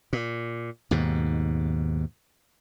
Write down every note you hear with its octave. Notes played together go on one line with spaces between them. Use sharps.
A#2
D#2 G#2 B2